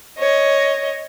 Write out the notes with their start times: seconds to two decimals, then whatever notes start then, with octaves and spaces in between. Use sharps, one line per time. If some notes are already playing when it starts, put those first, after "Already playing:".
0.19 C#5 D#5